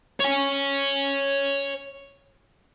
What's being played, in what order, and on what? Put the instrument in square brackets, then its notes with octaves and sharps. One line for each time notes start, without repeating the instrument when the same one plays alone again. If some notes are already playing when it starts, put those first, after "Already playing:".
[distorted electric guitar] C#5 G#5